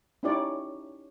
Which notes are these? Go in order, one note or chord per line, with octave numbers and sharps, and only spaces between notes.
C#4 D#4 E4 G4 C#5 D5